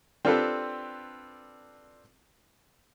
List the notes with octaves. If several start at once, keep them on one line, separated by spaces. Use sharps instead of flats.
C4 D4 F4 G4 A4 B4